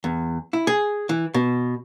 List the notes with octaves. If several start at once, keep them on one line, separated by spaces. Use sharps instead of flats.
E2
E4
G#4
E3
B2